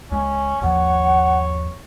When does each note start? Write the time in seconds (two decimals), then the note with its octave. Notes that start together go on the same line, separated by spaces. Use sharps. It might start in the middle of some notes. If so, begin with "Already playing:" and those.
0.11 C#2 G#3 C#4
0.62 G1 D#2 F3 C#5 F#5